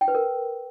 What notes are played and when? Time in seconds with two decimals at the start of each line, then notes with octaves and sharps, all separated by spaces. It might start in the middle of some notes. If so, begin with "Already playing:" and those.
0.01 G5
0.08 B4
0.15 A#4